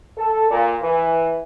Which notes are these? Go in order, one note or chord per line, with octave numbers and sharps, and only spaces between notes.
A4
A#2
E3